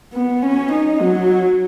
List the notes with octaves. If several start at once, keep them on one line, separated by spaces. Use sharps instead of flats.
B3
C#4
D#4
F#3